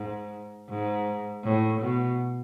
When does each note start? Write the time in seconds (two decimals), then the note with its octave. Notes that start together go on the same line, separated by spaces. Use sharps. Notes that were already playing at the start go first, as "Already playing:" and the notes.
Already playing: G#2
0.69 G#2
1.44 A2
1.81 B2